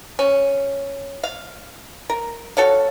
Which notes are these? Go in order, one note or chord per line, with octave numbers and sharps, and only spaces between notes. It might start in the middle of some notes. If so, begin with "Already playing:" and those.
C#4
F5
A#4
F#4 A4 C#5 F5